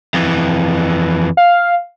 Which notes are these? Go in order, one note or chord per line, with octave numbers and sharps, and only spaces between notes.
F2 E3
F5